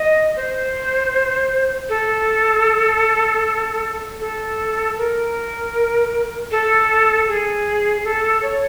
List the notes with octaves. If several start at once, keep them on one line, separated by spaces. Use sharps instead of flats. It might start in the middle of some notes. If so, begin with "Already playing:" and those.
Already playing: D#5
C5
A4
A4
A#4
A4
G#4
A4
C#5